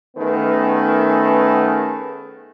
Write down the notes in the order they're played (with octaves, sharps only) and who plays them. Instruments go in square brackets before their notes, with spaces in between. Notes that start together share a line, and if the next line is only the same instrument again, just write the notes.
[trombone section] D#3 A3 B3 C#4 G#4 B4